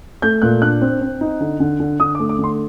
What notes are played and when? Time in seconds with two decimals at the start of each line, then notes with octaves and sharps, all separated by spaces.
0.22 A3 G6
0.42 A#2 F#6
0.62 D4 F#6
0.82 C4
1.01 C4
1.21 D#4
1.40 D3
1.60 D3
1.80 D3
2.00 D3 D#6
2.15 D6
2.19 A3
2.29 D6
2.39 D3
2.44 C6